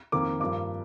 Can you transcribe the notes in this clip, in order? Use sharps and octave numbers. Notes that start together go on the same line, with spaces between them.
F2 D#3 A#3 D6
G2 F3 A#3 D6